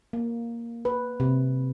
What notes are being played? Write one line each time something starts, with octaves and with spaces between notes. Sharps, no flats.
A#3
B4
C3